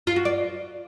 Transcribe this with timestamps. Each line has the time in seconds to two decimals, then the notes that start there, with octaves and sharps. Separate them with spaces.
0.07 F4
0.16 F#4
0.25 D5